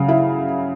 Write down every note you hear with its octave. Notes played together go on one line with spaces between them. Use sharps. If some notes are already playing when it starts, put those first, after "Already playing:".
Already playing: C#3 F#3
E4